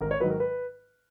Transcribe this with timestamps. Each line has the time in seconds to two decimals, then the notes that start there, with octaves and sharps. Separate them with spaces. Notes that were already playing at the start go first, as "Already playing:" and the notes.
0.01 G#1 A#4
0.11 C#5
0.20 G#2 D#3 F#3 B4
0.30 A#4
0.40 B4